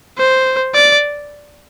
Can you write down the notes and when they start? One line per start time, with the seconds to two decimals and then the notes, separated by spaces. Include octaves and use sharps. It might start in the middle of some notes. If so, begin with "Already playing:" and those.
0.18 C5
0.75 D5